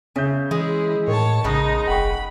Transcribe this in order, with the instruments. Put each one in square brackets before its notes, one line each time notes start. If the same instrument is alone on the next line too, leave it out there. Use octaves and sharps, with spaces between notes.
[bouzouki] C#3 [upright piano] C#4 E5 G6
[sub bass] E3 [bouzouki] G#3 [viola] E4 G#4
[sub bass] A2 [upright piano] D#3 [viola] C#5 A5
[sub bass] A#1 [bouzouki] C#3 G#3 [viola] D#4
[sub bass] F1 [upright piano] F#5 G5 C#6 [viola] B5